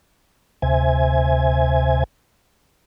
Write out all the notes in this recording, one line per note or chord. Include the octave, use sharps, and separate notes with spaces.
D2 C3 C5 E5 G#5 G#6